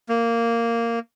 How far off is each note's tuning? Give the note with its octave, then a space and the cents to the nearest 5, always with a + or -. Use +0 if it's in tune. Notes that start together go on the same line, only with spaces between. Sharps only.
A#3 -10